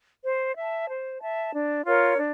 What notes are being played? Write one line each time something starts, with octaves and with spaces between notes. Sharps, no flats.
C5
E5 A5
C5
E5 A5
D4
F4 A#4 C#5
D4